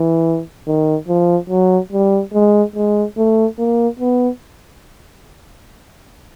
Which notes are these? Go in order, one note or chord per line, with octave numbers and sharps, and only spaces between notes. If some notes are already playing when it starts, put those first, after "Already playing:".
Already playing: E3
D#3
F3
F#3
G3
G#3
G#3
A3
A#3
B3